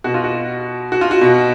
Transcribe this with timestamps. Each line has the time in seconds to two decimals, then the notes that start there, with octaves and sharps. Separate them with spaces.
0.04 B2 F#4
0.14 F4
0.24 F#4
0.92 F#4
1.01 F4
1.11 F#4
1.21 B2